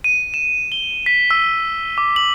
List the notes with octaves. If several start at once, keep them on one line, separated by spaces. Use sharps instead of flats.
D#7
E7
G7
B6
E6
D6
F#7